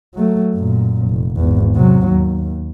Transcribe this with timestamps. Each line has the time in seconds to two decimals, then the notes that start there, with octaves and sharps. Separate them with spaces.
0.15 F#3 A3
0.55 F#2 A#2
1.08 F1
1.37 G#1 E2
1.75 C3 F#3
2.07 D#2